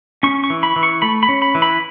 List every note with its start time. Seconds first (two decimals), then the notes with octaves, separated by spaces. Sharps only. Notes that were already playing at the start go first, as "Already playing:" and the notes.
0.23 C#4 C#6
0.44 C#6
0.50 E3
0.63 B5
0.76 E3
0.83 C#6
1.02 A3 B5
1.23 B5
1.29 C#4
1.42 B5
1.55 E3
1.62 B5